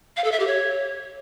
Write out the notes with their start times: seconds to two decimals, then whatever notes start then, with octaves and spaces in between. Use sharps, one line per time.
0.17 F5
0.24 A4
0.32 E5
0.40 G4
0.47 C#5